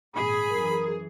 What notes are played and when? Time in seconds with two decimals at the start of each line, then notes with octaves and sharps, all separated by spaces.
0.15 G#1 A#2 G#4 B5
0.52 F#2 E3 A#4